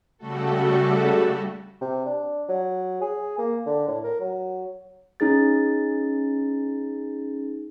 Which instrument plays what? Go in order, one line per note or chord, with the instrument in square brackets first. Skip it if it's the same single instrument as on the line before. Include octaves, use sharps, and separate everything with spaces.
[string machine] C#3 G3 A3 F#4 A4
[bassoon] C3
D4
F#3
G#4
A#3
D3
A2
A#4
F#3
[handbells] C#4 D#4 G#4 A6